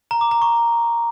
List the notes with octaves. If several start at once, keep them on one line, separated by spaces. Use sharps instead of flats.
A#5
D6
A#5
C#6